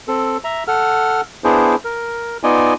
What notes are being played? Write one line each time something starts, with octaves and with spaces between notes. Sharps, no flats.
C4 A4
E5 A#5
A4 F#5 F6
B3 D4 E4 G#4 C5
A#4
B3 D#4 F4 D5 D#5 G#5